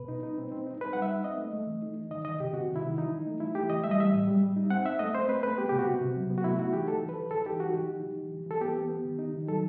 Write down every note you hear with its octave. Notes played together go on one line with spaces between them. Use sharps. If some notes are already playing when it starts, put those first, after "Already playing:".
Already playing: B2 B4
D#4
D#4
C4
C4
D#4
D#4 B4
G3 F#5
E5
D#4
C4 D#5
A3
A3
E3
D#4
D#4
D#3 D#5
D#3 D#5
C3 G4
C3 F#4
D#3
E4
D#3
E3 D#4
E3
A3
E3 E4
A3 G4
E3 D#5
G3 E5
D#5
G3 E5
A2
G3
G3
D#4
C4 F#5
C4 E5
A3 D#5
C4 C5
C4 B4
A3 B4
B3 G4
C3 G4
F#4
C3
C3
F#3
B3
F#4
A3 E4
D#4 F#4
E3 G4
E3 A4
E3
B4
E3
E3 A4
D#4 G4
D#4 F#4
E3 G4
D#4
E3
E3
E3
E3 A4
B3 G4
B3
B3
D#3
D#4
D#3
F#3 A4